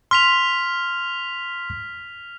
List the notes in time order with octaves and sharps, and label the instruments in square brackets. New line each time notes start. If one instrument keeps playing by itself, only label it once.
[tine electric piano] C6 [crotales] F6 B6 F7